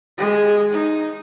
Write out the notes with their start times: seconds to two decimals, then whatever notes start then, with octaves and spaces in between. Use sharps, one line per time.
0.18 G#3
0.71 D#4